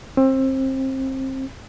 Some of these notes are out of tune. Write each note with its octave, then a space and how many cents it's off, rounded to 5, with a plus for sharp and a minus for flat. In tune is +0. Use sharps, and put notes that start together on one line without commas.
C4 +25